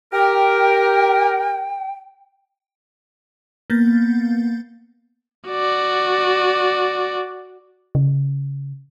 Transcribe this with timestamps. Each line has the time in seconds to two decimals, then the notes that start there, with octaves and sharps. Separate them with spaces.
0.13 G4 A#4 G5
3.70 A#3 B3 G6 A6
5.48 F#4 D5
7.95 C#3